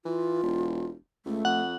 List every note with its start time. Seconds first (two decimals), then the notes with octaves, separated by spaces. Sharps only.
0.05 E3 F4
0.43 E1
1.26 C#2 A3
1.45 F2 F#5